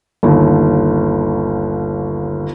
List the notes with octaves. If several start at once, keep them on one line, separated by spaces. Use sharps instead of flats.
G1 D#2